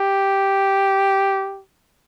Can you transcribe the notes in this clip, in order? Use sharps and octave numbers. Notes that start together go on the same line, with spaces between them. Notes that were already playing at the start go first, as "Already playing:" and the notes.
Already playing: G4